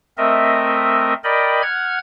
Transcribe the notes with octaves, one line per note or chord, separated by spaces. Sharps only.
A3 C4 A#4 D#5 E5
A#4 D5 D#5 G5 B5
F#5 F6 G#6